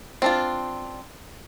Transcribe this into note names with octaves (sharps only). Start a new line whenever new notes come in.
C4 D4 F4